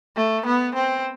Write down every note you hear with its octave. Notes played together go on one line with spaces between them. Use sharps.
A3
B3
C4